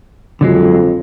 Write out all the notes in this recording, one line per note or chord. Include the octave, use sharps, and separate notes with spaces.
F2 D3 F#3 G#3